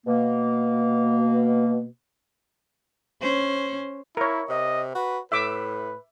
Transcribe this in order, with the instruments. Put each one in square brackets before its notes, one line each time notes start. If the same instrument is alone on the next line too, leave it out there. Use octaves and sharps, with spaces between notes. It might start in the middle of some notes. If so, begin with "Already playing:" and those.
[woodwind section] B2 A#3
[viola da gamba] C#4 C5
[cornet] E4 [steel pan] A#4 C#5
[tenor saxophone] C3 [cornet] D#5
[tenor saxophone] F#4 [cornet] B4
[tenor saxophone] A2 [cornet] B4 [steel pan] E5 D6